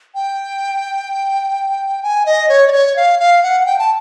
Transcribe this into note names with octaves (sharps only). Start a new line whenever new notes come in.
G5
G#5
D#5
C#5
D5
C#5
F5
F5
F#5
F#5
G5
A5